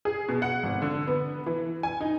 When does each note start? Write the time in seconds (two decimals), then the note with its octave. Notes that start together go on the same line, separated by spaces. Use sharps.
0.05 G#4
0.29 B2
0.42 F#5
0.63 G#1
0.82 D3
1.07 B3
1.46 E3
1.83 G#5
2.01 D#4